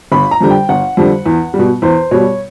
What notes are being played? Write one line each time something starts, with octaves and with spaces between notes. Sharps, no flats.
G1 B5
A#5
F2 D3 G3
G5
G1 F#5
F2 D3 G3
E2
G3
B2
E2 C5
B2 G3 C#5